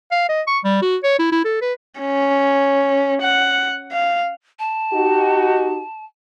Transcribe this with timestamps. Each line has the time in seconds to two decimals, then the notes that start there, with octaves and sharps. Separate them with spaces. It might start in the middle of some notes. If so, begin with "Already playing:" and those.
0.11 F5
0.29 D#5
0.47 C#6
0.64 G3
0.82 F#4
1.03 C#5
1.19 E4
1.32 E4
1.45 A4
1.62 B4
2.00 C#4
3.22 F#5
3.92 F5
4.59 A5
4.93 D#4 F#4 G4